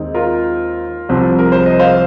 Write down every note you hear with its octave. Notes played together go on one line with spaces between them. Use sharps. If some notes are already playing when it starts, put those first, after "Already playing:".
Already playing: D#2 D#3 G#3 C4 D#4
F4 A#4
C2 C3 F3 C4
A#4
C5
D#5
C5 F5